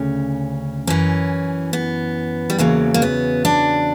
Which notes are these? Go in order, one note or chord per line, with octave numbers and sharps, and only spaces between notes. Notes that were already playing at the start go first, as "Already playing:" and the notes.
Already playing: D2 C#3 C#4
F#2 E3 C#4
B3
G3
E2 C#3 F#3 A#3
A#3
B3
D4